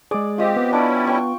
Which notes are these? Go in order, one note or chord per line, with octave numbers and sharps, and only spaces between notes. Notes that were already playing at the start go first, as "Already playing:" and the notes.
G#3 G#4 D5
C4 F4 G4 D#5
B3
G3 C#4 D4 E4 D5 D6
G5 C#6